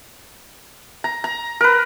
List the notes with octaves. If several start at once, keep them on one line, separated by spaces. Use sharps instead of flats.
A#5
A#5
A#4 B4